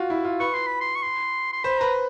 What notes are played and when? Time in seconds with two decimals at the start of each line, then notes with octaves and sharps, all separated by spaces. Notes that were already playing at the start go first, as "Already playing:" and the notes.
Already playing: F4 F#4
0.10 E4
0.24 F4
0.40 B4 C#6
0.54 C6
0.67 B5
0.81 C6
0.96 C#6
1.02 C6
1.53 C6
1.64 C5 B5
1.80 B4 A#5